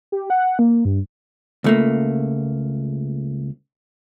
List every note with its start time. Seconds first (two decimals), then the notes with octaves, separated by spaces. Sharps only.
0.12 G4
0.30 F#5
0.59 A#3
0.85 G2
1.64 C#2 A3 A#3